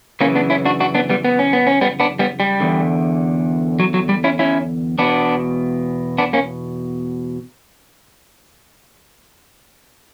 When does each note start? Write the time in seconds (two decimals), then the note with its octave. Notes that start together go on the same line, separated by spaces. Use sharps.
0.21 F#2 C#3 E3 A#3 C#4
0.35 B3 D4
0.50 C#4 E4
0.65 D4 F#4
0.80 D4 F#4
0.95 B3 D4
1.10 G3 B3
1.25 B3
1.39 C#4
1.53 B3
1.67 C#4
1.81 G3 B3
2.00 B3 D4
2.19 G3 B3
2.40 G3
2.60 E2 D3
3.80 F#3
3.94 F#3
4.09 G3
4.24 C#4 E4
4.39 C#4 E4
4.98 E2 B2 B3 D4
6.18 B3 D4
6.33 A#3 C#4